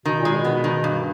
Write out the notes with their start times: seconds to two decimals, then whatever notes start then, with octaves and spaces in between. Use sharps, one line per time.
0.05 B2 D#3
0.19 A#2
0.25 G#3
0.32 B2
0.45 B3
0.64 D#3
0.84 G2